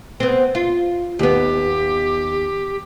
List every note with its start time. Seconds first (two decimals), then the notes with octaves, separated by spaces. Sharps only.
0.20 B3 C4
0.55 F4
1.19 D#2 B3 G4